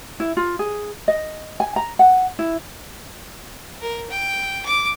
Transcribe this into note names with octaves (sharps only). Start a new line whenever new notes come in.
E4
F4
G#4
D#5
G#5
A#5
F#5
E4
A#4
G5
D6